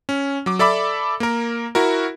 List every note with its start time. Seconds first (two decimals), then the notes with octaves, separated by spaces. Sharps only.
0.09 C#4
0.46 F#3 D6
0.59 A4 D5 E5 B5 D6
1.20 A#3 A#4
1.75 E4 F#4 A#4